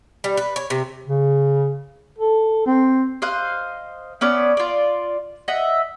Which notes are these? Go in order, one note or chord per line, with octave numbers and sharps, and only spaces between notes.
G3
B4
C#5
C3
C#3
A4
C4
C5 D#5 F5 F#6
B3 C#4 D5
F4 D5
D#5 E5 F#5